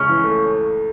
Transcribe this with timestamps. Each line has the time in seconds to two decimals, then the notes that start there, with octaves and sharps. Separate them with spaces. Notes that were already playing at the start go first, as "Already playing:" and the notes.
Already playing: C#2 C#3 C#4
0.09 E3
0.24 A3